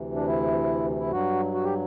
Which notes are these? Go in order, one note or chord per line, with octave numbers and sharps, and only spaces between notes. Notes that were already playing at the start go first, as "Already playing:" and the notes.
Already playing: D2 C3 E3
D4
E4
E4
G2 F#3 F#4
F#4
G4